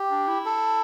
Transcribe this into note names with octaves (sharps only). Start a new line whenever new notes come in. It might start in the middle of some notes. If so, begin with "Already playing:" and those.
Already playing: G4
D4
E4
A4